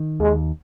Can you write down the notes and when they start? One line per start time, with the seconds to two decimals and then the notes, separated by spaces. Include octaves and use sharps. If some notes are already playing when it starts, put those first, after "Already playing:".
Already playing: D#3
0.20 D#2 G#3